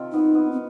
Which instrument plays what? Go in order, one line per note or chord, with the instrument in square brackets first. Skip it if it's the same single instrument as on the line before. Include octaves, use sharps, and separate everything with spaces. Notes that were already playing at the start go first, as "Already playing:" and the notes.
Already playing: [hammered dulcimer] C3 D#3 F4
[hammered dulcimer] B3 [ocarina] D#4
[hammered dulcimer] B3
[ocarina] C4